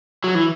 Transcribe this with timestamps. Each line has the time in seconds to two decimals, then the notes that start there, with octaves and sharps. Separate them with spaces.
0.24 F#3
0.35 E3